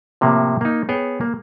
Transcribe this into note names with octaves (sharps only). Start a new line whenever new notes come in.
A2 C3 F3 A#3
A#3 D#4
B3 G#4 C#5 G5
A#3